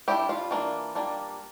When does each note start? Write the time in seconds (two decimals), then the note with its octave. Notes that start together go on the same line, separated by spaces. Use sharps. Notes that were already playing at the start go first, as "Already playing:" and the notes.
0.08 G3 D4 E4 G4
0.29 F4
0.51 E3 A#3 D4
0.95 G3 A#3 D4